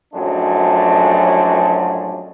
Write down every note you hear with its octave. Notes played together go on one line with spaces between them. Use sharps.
F#2 A2 F3 F#3 G#3 D4